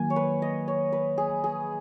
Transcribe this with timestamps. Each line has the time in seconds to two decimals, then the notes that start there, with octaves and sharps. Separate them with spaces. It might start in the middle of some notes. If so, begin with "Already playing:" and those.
Already playing: D#3 F#3 A#3 G#5
0.10 C#5
0.16 B4
0.42 D#5
0.68 C#5
0.93 B4
1.18 G#4
1.44 G#4